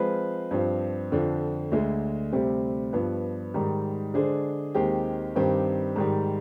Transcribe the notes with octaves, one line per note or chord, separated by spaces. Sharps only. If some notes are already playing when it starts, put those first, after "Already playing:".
Already playing: F3 G#3 C4 F4 B4
G2 F3 C4
F2 D3 F3
D2 D3 G#3
D2 C3 G3 C4
G2 F3 B3
G#2 D#3 G3
D3 G#3 D4 G#4 C5
D#2 D#3 G#3 C4 G4
G2 D#3 G3 C4 G4
G#2 D#3 G3